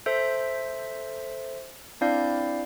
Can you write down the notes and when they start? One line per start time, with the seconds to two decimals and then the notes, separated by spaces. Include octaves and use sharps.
0.06 A4 C5 E5 G6
2.01 C4 D4 E4 D5 F5 G6